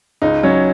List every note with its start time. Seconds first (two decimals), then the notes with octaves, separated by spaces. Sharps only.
0.22 C#2 D#4
0.43 F#3 C#4